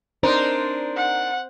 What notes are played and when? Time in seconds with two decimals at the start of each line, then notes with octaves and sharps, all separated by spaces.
0.23 D4 D#4 A#4 C5
0.97 F#5